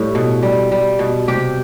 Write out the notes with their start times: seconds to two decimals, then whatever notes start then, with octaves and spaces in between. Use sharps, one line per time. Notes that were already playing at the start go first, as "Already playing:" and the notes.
Already playing: A2 G3 E4
0.15 B2
0.43 G3
0.72 G3
0.99 B2
1.28 C3 G4